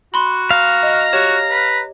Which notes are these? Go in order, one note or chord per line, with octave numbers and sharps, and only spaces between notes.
F#4 B5 C6
F5 A#5
D#5
F#4 G4 C#5 E7
B4